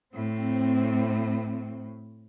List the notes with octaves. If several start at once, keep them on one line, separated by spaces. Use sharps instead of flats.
A2 C4